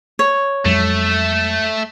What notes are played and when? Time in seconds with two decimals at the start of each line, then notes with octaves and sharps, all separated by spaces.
0.19 C#5
0.65 F2 F#3 G#3 A3